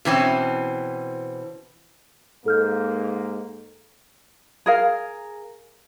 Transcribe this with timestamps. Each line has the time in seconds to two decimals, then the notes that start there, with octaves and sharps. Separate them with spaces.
0.05 B2 E3 C4 C#4
2.46 G#2 A#3 A4 F6 G6
4.66 G#4 A#4 F5